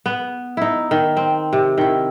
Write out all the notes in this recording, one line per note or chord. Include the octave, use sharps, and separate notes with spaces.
B3
D#4 E4
D#3
C4
C3
D#3 E4